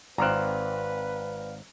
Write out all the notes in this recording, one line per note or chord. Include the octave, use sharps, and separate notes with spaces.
G#1 C4 B4 D5 F5 A#5 F6 F#6